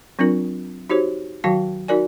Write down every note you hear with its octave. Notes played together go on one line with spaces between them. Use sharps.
F#3 C4 D4 F4 A#4
D#4 F#4 G4 C5 C#5
D#3 F#3 F#4 F5 G5 A5
D#4 F#4 A#4 D5 G#5